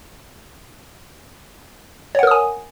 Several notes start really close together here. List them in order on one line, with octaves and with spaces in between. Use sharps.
C#5 F#5 A#4 D#6 G#5